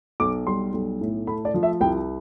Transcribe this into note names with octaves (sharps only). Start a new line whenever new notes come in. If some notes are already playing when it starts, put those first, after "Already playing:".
B1 D6
G3 C6
B1
A2
A3 B5
D5
F3
E5
C2 G5